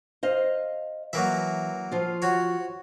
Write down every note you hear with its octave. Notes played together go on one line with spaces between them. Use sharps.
C5 D#5 F5
E3 F#3 A#3 E5
F3 F4
F#4 C#5